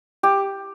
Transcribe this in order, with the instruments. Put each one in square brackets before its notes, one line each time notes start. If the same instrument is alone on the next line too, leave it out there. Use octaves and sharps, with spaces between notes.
[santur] G4